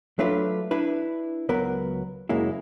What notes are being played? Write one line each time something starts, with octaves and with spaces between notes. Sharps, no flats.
F#3 A3 D4 F4 B4
D4 E4 B4
C#2 F#3 B3 A#4
F#2 C#3 G#3 A#3 E4